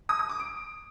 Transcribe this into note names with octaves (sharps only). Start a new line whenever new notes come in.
D#6
D#6
D6
D7